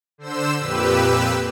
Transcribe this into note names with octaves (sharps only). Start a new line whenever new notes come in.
D3 C5 E6 E7
F2 A#2 G4 B4 E6